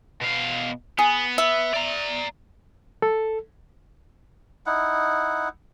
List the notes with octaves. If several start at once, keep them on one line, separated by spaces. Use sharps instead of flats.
B2 F5
B3 G#4
B3 E5
D5 A#5
A4
D#4 E4 F#5